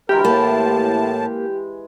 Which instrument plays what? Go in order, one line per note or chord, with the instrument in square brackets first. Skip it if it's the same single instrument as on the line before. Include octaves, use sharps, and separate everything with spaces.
[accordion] D2 A#4 [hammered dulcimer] E3 G#3 [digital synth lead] G4
[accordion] A2 A5 [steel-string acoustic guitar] A#3